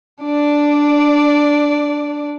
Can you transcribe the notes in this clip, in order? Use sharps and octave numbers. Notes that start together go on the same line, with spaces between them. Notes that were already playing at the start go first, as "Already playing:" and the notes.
D4 D5